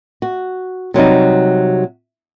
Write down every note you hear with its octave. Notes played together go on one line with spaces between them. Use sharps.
F#4
C3 F#3 G3 D#4